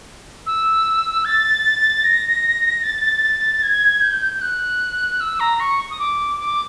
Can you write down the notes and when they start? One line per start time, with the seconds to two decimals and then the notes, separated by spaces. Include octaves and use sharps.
0.46 E6
1.24 A6
2.03 A#6
2.83 A6
3.62 G#6
4.01 G6
4.22 G6
4.34 G6
4.41 F#6
5.20 E6
5.39 A#5
5.59 C#6
5.90 D#6
5.99 D6
6.40 D6